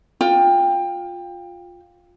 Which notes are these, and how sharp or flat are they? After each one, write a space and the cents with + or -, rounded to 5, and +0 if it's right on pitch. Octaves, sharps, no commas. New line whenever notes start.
F4 +15 G5 +20